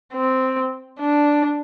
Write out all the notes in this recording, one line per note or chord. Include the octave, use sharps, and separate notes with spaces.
C4
D4